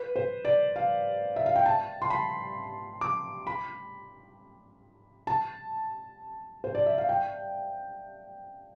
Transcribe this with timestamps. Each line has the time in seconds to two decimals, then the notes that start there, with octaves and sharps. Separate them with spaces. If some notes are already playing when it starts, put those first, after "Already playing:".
Already playing: B4
0.16 C5
0.45 D5
0.76 F5
1.36 E5
1.46 F5
1.56 G5
1.66 A5
2.02 C6
2.10 B5
3.01 D6
3.47 B5
5.27 A5
6.64 C5
6.75 D5
6.86 E5
6.98 F5
7.09 G5